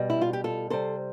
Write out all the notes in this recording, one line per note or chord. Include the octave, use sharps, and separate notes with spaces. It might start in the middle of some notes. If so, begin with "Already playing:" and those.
Already playing: B2 G3
E4
F4
G4
F4 A4
C3 G3 A4 C5